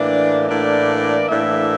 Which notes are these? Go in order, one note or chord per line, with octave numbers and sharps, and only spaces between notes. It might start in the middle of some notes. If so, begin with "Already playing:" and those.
Already playing: A2 E3 A#3 D4 D5
A2 E3 A#3 D4 D5
A2 E3 A#3 D4 E5